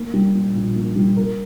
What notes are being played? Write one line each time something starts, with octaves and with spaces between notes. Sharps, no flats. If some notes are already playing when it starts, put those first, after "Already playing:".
Already playing: A#3
G3
A#2
A#1
A#3
G3
A#4